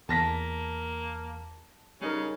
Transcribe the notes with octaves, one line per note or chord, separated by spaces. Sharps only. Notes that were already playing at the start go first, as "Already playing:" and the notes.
E2 A#3 A5 A#6 B6
C#3 G3 D#4 A#4